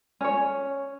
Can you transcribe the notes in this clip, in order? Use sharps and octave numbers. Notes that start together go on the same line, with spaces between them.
C#4 C#5